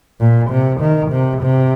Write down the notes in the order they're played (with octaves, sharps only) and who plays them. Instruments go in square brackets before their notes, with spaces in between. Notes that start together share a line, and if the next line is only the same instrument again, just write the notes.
[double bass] A#2
C3
D#3
C3
C3